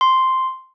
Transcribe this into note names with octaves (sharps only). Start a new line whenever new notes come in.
C6